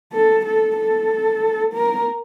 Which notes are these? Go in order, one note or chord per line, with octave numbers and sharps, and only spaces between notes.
A4
A4
A4
A#4